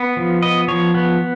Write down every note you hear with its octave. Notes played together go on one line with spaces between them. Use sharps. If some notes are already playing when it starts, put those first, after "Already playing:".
Already playing: B3
F3
B3 D#5
F3 C#5
B3